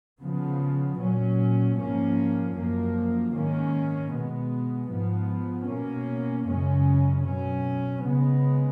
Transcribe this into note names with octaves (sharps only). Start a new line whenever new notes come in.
C#3 F3 B3
A#2 F#3 C#4
G#2 F3 A#3 C#4
F#2 F3 A#3
G#2 D#3 A#3 C#4
B2 G#3 B3
G#2 F3 B3
B2 A#3 C#4
F#2 C#3 G#3 C#4
B2 F#3 C#4
C#3 G#3 B3